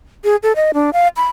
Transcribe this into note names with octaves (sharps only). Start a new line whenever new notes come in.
G#4
A4
D#5
D4
F5
B5